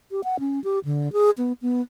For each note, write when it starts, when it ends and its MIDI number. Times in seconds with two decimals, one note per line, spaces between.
0.11 0.21 67
0.24 0.40 78
0.40 0.62 61
0.64 0.79 67
0.85 1.12 50
1.13 1.30 68
1.38 1.53 59
1.62 1.81 59